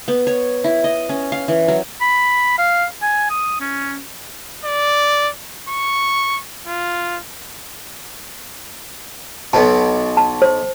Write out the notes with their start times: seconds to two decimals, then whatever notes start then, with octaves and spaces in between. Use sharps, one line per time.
0.08 B3
0.27 C#5
0.64 E4
0.84 D#5
1.09 C#4
1.32 F5
1.48 E3
1.68 F#3
2.01 B5
2.58 F5
3.02 G#5
3.30 D#6
3.61 C#4
4.65 D5
5.69 C#6
6.67 F4
9.53 B1 B2 A5
10.17 A5
10.42 C5